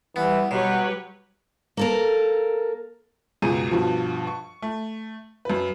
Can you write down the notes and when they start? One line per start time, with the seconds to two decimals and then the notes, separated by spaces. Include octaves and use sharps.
0.16 E3 G3 B3
0.51 B2 F#3 G4 B4 C#5
1.77 A#3 A4 A#4
3.42 C#2 F#2 B2 G#4 A#5 D#7
3.71 G2 B2 F3
4.27 C#6
4.62 A3
5.45 F#2 B4